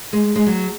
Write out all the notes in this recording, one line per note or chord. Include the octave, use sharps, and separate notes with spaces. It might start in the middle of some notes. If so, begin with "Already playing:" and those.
G#3
G#3
F#3